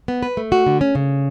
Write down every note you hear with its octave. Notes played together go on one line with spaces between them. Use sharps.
B3
B4
A3
F#4
D3
C#4
C#3